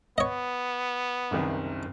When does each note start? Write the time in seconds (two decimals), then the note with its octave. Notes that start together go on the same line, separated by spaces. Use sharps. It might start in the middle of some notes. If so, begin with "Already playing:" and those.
0.18 B3 C#5 D#5
1.31 F#1 C2 D#3